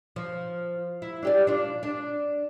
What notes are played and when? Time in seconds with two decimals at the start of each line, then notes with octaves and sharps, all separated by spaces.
0.16 F3
1.02 E4
1.23 D4 G4 D5
1.47 D4 F4
1.83 D4